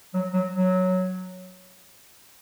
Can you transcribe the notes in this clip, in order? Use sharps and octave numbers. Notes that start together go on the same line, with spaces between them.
F#3
F#3
F#3